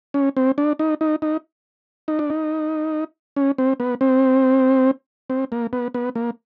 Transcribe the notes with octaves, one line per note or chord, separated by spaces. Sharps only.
C#4
C4
D4
D#4
D#4
D#4
D#4
D4
D#4
C#4
C4
B3
C4
C4
A#3
B3
B3
A#3